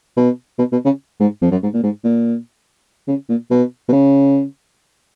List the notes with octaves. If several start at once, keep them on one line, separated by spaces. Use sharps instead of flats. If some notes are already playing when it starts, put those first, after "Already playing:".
B2
B2
B2
C#3
G#2
F2
F#2
G#2
A#2
G#2
A#2
C#3
A#2
B2
B2
C#3